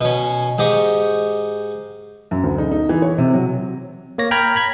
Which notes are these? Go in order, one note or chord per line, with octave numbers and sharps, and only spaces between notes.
B2 C#4
G#2 G4 D#5 C#6
F#2
D2
D#4
D#4
E3
C#5
C3
F#3
A#3 C#5 A#6
G5 A#5 B5 F6 G#6
B5 G#6